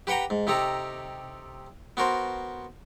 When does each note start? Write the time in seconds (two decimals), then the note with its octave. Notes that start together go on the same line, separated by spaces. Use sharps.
0.07 G4 B4 F#5 G5 A#5
0.30 G#2
0.47 C3 D#4 G4 A4 A#5
1.97 B3 F#4 A#4 C5